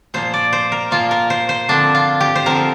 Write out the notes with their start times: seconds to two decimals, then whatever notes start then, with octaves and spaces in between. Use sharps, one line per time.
0.14 A#2 F3 A#3 C5
0.34 D5
0.53 C5
0.72 A#4
0.91 A#2 F3 A#3 F4
1.11 A#4
1.30 C5
1.49 C5
1.68 D3 F3 C4 D4
1.95 F4
2.20 G4
2.35 C5
2.46 D3 F3 C4 A#4